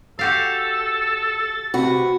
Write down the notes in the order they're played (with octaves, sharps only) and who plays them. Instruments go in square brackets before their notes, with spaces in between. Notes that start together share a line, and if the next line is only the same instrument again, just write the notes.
[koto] F#4 G4 F5 [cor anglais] A4 [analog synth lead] A6
[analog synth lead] C3 [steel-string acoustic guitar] F#4 [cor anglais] B4